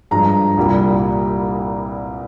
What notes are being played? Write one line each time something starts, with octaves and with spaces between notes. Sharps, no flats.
G2 F3 G#3 A#5
C2 A#2 G3 A#3